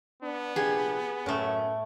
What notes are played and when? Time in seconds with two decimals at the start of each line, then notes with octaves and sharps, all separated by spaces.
0.23 B3 D4
0.56 A#1 C3 D4 G4 G#4
1.26 F#2 A2 A3 C#4